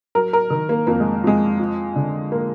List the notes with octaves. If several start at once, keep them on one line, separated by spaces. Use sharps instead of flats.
F#3 A#4
A#4
D#3
A#3
F2 A#3
G#3
F2 G#3
F3
D3
A#3